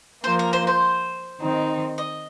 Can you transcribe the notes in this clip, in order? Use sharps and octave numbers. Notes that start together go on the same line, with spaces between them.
F3 A#3 F4 C5
A#4
C5
C5
D#3 C4 D#4
D#5